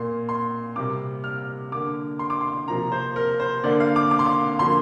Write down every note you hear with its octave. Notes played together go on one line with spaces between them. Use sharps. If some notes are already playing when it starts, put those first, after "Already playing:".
Already playing: A#2 A#3 C6
C6
C3 G3 A#3 D6
F6
D3 A#3 D6
C6
D6
C6
C3 F3 A#3 A#5
C5
A#4
C5
D3 A#3 D5
F5
D6
D6
C6
D6
D3 F3 A#3 C6